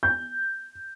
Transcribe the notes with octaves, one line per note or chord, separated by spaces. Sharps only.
G6